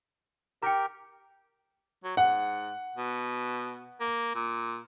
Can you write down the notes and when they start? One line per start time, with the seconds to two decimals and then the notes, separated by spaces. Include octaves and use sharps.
0.63 G4 A#4 G5 A#5
2.04 F#3
2.17 G#2 F#5
2.96 B2
4.01 A#3
4.35 A#2